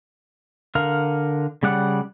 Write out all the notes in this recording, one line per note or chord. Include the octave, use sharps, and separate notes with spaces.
D3 A#4 F5
C#3 G3 D5 F#5